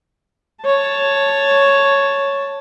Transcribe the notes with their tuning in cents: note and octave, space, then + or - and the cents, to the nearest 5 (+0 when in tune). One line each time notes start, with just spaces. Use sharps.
C#5 +0 A5 +0